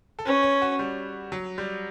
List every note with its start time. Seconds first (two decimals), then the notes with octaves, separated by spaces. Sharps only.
0.19 A4
0.25 C#4 B4
0.43 C#5
0.62 F#4
0.79 G3
1.32 F#3
1.58 G3